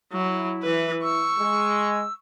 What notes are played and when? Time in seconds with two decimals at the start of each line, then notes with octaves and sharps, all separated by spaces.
0.13 F#3 E4
0.63 E3 B4
1.03 C#6 E6
1.39 G#3